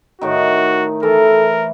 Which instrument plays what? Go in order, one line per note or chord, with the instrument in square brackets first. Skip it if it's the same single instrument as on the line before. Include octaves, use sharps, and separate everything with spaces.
[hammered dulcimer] A2 D#3 [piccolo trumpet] F#4
[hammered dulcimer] E3 [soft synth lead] A4 [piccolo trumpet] A#4